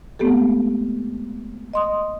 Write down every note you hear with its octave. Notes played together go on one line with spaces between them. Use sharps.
G#3 A3 B3 C4 G4 A4
D#5 C6 D#6